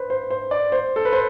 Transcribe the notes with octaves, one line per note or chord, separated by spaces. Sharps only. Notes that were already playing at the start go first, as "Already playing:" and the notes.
Already playing: B4 C5
C5
C5
D5
C5
A4
B4
C5